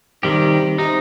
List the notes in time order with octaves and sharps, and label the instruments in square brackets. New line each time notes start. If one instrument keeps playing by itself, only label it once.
[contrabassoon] C3 [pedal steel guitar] D#3 G3 G4
[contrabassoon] C3 [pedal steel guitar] D#4